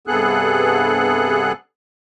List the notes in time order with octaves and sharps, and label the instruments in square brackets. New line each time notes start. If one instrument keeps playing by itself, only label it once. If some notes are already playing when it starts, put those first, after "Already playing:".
[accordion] G2 C3 B3 G#4 A4 F#6